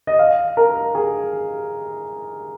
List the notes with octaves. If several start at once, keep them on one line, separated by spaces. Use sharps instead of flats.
D#5
F5
A#4
G#4